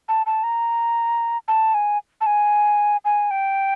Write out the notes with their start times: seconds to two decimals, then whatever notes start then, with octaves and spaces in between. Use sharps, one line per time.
0.09 A5
0.26 A5
0.43 A#5
1.48 A5
1.74 G#5
2.21 A5
2.26 G#5
3.05 G#5
3.31 G5